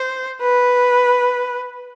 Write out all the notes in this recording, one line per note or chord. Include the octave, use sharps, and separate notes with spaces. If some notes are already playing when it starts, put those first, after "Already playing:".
Already playing: C5
B4